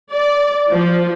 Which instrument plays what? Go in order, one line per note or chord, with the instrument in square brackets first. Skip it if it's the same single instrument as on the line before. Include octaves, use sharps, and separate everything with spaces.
[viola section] D5
F3